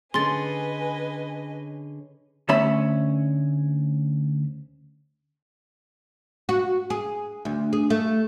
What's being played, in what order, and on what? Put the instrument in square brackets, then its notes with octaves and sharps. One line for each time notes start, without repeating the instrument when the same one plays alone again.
[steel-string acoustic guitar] D3 C#4 G#4 [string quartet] B4 D#5 G#5 [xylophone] C6 A6
[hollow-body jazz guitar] D2 A3 C#4 E5 B5
[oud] F#4
G#4
D2
G#4
A3